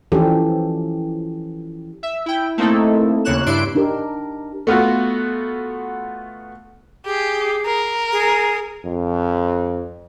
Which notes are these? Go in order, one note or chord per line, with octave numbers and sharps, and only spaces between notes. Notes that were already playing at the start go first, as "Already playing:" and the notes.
E3 F3 C#4 D4 G4 A4
E5
E4 G5
A3 A#3 C4 D#4 E4 A4
D#2 C#3 A#3 C#5 F#6 E7
G2 D4 E4 C6 D7
D4 D#4 G4 A#4
A3 B3 F4 F#4
G4 G#4
A#4
G#4
F2